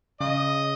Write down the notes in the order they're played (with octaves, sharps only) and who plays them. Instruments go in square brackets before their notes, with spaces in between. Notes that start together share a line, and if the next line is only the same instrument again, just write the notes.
[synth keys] C#3 [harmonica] D#5